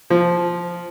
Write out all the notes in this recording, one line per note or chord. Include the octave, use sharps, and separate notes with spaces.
F3